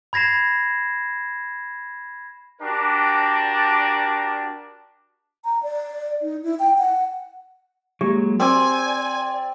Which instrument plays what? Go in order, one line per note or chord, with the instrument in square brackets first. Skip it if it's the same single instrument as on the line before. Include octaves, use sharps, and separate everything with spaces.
[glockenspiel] B5 G#6 A#6 C7 E7
[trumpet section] D4 F#4 G4 A#4 D5 A5
[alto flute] A#5
D5
D#4
E4
G5
F#5
[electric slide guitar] F#3 G#3 A#3 [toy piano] G4
[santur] C4 D6 [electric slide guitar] D5 [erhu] G#5